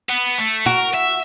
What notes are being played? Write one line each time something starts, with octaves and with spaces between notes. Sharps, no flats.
B3
A3
F#4 A#4
E5